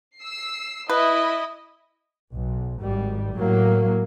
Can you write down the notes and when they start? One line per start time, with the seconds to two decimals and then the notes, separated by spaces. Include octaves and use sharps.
0.19 E6 C7
0.90 E4 B4 D#5
2.33 B1
2.81 G#1 G3
3.34 A2 F#3 A#3